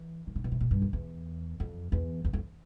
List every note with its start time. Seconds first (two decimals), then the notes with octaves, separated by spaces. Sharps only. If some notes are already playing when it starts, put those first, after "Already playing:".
Already playing: E3
0.27 D#3
0.36 C#3
0.44 B2
0.52 C3
0.60 A#2
0.71 G2
0.82 F2
0.93 E2
1.60 F2
1.92 E2
2.25 E2
2.33 F2